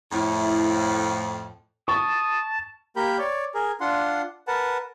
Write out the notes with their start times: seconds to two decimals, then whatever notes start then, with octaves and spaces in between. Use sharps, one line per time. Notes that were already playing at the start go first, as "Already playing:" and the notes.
0.12 F2 A2 E4
1.88 A5 C#6 D#6
2.96 A#3 G4 A#4 B5 G6
3.19 C#5 D5
3.54 G#4 A#4
3.81 D4 F4 F#5 C6
4.48 A#4 B4 F#5 A5